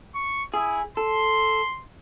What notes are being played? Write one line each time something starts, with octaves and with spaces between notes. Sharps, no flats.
C#6
E4 G#4
A4 C6